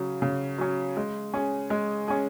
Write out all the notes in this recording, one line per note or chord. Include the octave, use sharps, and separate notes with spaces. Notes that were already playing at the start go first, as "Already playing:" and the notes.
Already playing: C#3 F#3 C#4
C#3
F#3 C#4
G#3
C#4 G#4
G#3
C#4 G#4